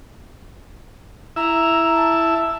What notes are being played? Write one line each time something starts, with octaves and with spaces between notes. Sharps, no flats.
E4 E5 A#5
A5